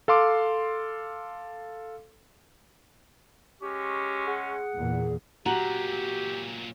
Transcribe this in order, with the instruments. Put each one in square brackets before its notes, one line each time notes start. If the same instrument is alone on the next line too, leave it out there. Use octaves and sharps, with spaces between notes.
[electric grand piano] A4 F5 C6 D6
[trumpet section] G#3 C#4 C#6 [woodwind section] G4
[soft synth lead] G#4 [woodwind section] F#5
[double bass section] E2 A#2
[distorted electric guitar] A#2 F#3 [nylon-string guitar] F#4 [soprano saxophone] G4 [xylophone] A#5 F#7